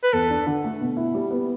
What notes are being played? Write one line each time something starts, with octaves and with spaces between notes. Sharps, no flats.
B4
E2 A4
D4
D3
A3
B2
E4
G3
B3